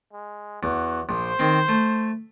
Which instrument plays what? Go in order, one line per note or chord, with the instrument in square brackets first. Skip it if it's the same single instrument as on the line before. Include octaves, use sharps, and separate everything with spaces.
[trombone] G#3
[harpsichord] E2 [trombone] F#4
[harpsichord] A#1 [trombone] C5
[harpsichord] D#3 C4
A3